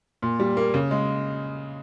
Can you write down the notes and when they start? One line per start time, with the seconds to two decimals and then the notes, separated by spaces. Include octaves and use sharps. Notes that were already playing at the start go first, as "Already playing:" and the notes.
0.22 A#2
0.40 G3
0.57 A#3
0.74 C#3
0.91 G#3